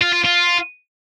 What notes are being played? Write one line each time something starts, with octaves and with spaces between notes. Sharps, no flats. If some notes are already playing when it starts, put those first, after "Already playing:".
F4
F4
F4